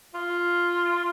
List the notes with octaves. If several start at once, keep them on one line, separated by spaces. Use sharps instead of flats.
F4